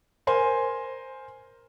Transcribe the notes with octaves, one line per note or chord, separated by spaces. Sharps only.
A#4 C5 G#5 C6